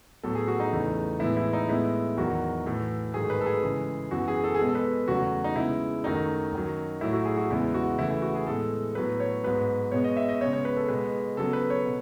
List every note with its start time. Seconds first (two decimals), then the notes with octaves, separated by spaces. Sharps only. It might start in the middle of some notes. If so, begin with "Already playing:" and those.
0.23 A2 F#3 B3 A4
0.35 G#4
0.48 F#4
0.60 D#4
0.72 E2 C#3 E3 A3
1.20 A2 E3 G#3 B3 E4
1.37 E4
1.53 D#4
1.68 A2 G#3 B3 E4
2.17 E2 D#3 F#3 F#4
2.66 A2 E3 A3
3.14 G#2 D#3 F#3 A3 G#4
3.30 B4
3.41 A4
3.46 G#4
3.63 C#3 E3 G#3
4.11 F#2 E3 B3 F#4
4.28 G#4
4.44 A4
4.55 G#4
4.59 B2 G#3 B3 A4
4.69 A4
4.75 B4
5.08 E2 C#3 F#3 A3 F#4
5.44 D#4
5.56 C#3 G#3 B3 E4
6.04 F#2 D#3 F#3 A3 D#4
6.52 F#2 D#3 F#3
7.01 A2 F#3 A3 E4
7.13 F#4
7.25 G#4
7.37 F#4
7.50 E2 C#3 E3 G#3 B3 E4
7.74 F#4
7.98 C#3 E3 A3 E4
8.10 E4
8.22 F#4
8.35 G#4
8.47 A2 G#3 B3 A4
8.95 A2 F#3 B3 B4
9.20 C#5
9.43 G#2 F#3 B3 B4
9.92 B2 G#3 B3 C#5
10.04 D#5
10.17 E5
10.29 D#5
10.40 C#3 G#3 B3 C#5
10.53 C#5
10.65 B4
10.77 A4
10.88 B2 G#3 B3 B4
11.37 C#3 F#3 B3 A4
11.53 B4
11.70 C#5
11.85 B2